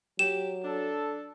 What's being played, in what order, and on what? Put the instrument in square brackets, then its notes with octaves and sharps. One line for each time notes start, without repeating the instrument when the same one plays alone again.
[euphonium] F#3 [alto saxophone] G4 [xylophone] E7
[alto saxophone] D4 [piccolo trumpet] A4